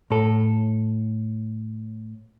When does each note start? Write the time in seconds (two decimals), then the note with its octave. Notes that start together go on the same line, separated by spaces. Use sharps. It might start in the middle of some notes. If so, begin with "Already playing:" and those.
0.10 A2 A4